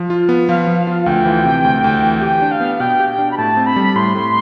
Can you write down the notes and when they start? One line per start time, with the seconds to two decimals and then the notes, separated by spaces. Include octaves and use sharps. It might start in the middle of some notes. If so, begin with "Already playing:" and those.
Already playing: F3
0.10 F4
0.29 B3
0.49 F3 F5
0.67 F3
0.78 F5
0.87 F4
1.03 F5
1.06 D2 G5
1.26 E3
1.45 C3
1.64 D2
1.84 D2
2.02 E3
2.21 G4 G5
2.42 D4
2.51 F5
2.60 B3
2.80 B2 G5
3.00 G4
3.09 G5
3.19 D4
3.31 B5
3.37 A2 A5
3.57 C4
3.66 B5
3.76 G3
3.95 A2 C6
4.15 A2